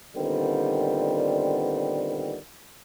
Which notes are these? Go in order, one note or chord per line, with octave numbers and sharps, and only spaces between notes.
A#2 D3 D#3 G3 B3 C4